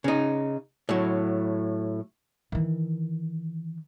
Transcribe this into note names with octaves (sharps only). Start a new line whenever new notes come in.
C#3 D#4
A2 F#3
D#3 E3